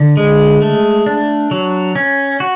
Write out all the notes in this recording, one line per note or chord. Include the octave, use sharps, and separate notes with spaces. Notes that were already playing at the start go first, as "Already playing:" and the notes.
Already playing: D3
G#3
A3
D4
F#3
C#4
F#4